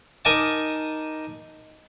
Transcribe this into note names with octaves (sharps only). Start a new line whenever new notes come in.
D#4 A#4 D#5 G#5 A5 D6